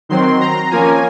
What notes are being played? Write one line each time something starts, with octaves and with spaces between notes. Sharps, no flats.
D#3 F#3 C4 C6
A#5
F3 A#3 C#4 G#5